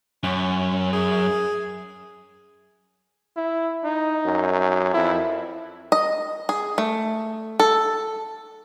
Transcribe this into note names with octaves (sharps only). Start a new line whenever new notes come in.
F#2 C#4
G#4
E4
D#4
F#2
F2 E4
D#5
G#4
A3
A4